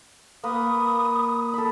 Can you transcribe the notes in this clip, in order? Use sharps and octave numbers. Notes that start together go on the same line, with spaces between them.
A#3 A#4 B4 D#6
A4 B5